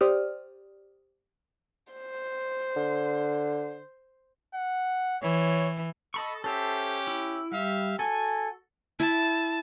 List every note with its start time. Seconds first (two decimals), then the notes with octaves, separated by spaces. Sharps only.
0.01 G4 C5 D5 D#6 F6
1.92 C5
2.76 D3
4.54 F#5
5.23 E3 C#5
6.14 A4 D#5 B5 C#6
6.44 C#4 G4 A4 C5 E5
7.07 E4
7.52 G3 E5 F5
7.99 F#4 A4 G#5
9.00 E4 A5